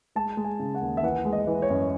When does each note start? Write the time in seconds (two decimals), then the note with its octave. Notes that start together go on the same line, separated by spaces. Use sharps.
0.15 G#3 A5
0.37 G#3
0.44 G#5
0.59 C#3
0.75 F#5
0.81 D#2
0.97 E5
1.03 E3 F#5
1.25 G#3
1.33 D#5
1.47 E3
1.62 C#5
1.70 F#2